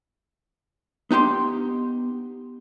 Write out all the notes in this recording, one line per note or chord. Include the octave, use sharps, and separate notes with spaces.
B3 D#4 G4 C6